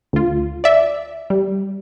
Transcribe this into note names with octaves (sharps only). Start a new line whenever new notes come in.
D2 F4
D5 E5
G3